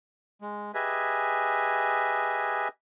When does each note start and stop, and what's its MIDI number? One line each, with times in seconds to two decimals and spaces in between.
0.41 0.72 56
0.74 2.68 67
0.74 2.68 68
0.74 2.68 71
0.74 2.68 75
0.74 2.68 76
0.74 2.68 80